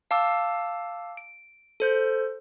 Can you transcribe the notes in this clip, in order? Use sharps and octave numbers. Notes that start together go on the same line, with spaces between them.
F5 A5 D6 E6
D7
A4 C5 G6